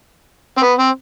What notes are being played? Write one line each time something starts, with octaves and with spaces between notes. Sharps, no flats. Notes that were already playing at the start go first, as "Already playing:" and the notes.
C4
B3
C4